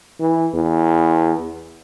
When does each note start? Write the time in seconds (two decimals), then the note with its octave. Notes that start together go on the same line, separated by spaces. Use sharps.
0.20 E3
0.53 E2